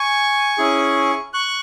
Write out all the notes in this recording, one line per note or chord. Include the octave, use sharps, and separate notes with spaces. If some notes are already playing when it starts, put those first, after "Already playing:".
Already playing: G#5 C#6
C#4 E4 G#4
C#6 F#6